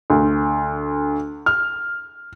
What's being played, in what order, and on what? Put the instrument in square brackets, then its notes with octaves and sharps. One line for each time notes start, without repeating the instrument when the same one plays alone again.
[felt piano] D2
F6